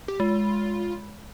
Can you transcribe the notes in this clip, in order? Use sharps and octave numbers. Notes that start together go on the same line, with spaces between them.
G4
G#3 F4